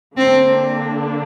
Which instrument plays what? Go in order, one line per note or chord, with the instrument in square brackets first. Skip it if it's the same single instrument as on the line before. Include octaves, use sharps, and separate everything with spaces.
[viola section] D3 A#3 D4 [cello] C4